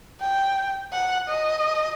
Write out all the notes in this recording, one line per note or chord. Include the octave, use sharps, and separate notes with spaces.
G5
F#5
D#5